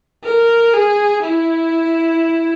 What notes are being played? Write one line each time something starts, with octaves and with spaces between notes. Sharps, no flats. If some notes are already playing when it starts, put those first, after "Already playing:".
A#4
G#4
E4